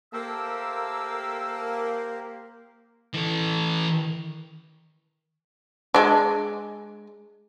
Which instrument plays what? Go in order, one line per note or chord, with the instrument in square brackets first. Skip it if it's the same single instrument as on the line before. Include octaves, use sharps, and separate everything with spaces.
[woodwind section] A3 A5 E6 [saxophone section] A#3 [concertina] G4 A#4 C5
[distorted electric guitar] E3 A4
[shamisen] G#3 D4